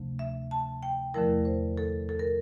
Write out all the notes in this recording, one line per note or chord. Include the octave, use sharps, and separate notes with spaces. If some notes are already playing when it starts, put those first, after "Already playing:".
Already playing: D2 C3 F3 A3
E5
A5
G5
E2 D3 F3 A3 E4 A#4
C5
A4
A4
A#4